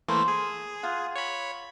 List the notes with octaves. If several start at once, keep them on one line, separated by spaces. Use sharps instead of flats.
E3 A3 A#3 C5
G#4
F4 F#5
C#5 B5